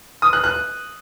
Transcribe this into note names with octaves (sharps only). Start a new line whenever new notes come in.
D#6
F#6
F#6